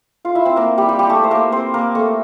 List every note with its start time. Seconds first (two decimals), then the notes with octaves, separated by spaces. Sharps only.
0.25 F4 F5
0.35 E4 E5
0.45 C4 C5
0.56 A#3 A#4
0.78 G3 G4
0.89 G3 G4
0.99 G3 G4
1.09 A3 A4
1.24 C5
1.31 A#3 A#4
1.52 C4 C5
1.74 A#3 A#4
1.95 A3 A4